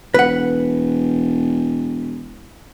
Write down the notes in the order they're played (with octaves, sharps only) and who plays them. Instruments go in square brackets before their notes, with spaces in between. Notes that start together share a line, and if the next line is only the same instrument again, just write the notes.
[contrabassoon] E1 [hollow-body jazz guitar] B4 F#5